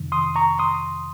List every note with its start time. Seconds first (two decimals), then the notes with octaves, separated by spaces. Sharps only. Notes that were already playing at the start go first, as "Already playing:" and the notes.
Already playing: F2 C3 D#3
0.12 C6 D#6
0.36 A#5 C#6
0.59 C6 D#6